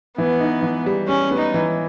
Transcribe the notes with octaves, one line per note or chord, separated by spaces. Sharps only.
E3 B3
D#4
E3
G3
G3 C#4
B3
D#4
E3